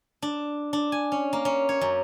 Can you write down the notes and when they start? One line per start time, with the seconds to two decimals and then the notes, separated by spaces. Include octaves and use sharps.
0.22 D4
0.73 D4
0.92 G#5
1.12 C#4
1.33 A#3
1.45 C#4
1.69 C#5
1.81 F#2